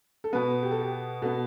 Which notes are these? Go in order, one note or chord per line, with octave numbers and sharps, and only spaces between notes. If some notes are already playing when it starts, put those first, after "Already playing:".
A4
B2 B3 B4
G4
A4
G4
B2 B3 A4